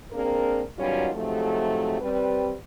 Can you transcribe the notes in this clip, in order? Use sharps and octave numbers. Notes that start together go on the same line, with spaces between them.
A#3 C4 D4 G#4 A#4
B2 D#3 F#3 G3 C#4 F4
G#2 C3 F3 F#3 A3
G3 C4 B4